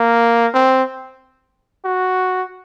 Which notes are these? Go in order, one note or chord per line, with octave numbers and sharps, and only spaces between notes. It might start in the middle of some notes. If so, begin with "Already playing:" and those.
Already playing: A#3
C4
F#4